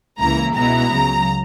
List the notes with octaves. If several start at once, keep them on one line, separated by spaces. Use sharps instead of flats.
C#2 C#3 E3 A#3 E4 A#5
C#2 B2 G#3 B3 E4 A#5
C#2 C#3 F#3